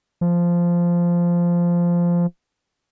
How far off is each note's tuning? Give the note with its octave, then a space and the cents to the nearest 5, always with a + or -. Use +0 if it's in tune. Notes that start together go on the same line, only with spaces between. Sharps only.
F3 -10